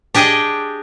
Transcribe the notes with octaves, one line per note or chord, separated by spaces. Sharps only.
D4 G4 G#4 D#5 G5